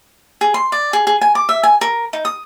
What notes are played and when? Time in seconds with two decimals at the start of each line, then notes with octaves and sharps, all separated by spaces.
0.41 G#4
0.54 C6
0.72 D5
0.93 G#4
1.07 G#4
1.21 G#5
1.35 D6
1.49 E5
1.63 G#5
1.81 A#4
2.13 D#4
2.25 D#6